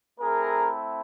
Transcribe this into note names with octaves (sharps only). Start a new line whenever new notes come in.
A3 C4 E4 G#4 A#4